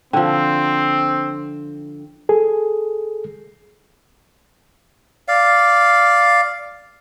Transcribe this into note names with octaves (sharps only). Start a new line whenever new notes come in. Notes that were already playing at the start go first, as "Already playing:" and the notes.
D3 F3 C4 G5
G#4 A4
D5 F5